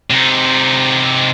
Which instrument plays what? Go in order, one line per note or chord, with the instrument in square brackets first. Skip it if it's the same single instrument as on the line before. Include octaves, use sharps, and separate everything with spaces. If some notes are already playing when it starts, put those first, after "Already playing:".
[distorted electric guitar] C3 D#4